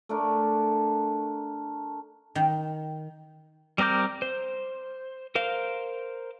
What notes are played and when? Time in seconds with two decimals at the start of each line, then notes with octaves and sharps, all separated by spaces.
0.09 A3 D4 A#4
2.35 D#3
3.78 G3 C4 A#4 D6 G6
4.22 C5
5.35 A#4 C5 F5